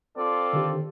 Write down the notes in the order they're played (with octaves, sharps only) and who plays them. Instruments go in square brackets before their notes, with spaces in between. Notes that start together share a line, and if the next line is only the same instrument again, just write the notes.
[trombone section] C4 F4 A4 [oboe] D5
[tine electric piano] D3 D#3 G4